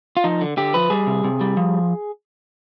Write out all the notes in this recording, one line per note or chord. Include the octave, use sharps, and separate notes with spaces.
F4
F3 D#4
D3
D3 G4
F3 B4
G3 G#4
C3
C3
G3
F3